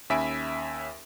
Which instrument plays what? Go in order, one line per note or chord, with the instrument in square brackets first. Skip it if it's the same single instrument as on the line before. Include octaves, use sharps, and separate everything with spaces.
[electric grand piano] D#2 C#4 E5 G#5 B5 D7